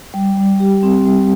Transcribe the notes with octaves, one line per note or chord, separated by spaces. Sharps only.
G3
G3
G4
C4
G3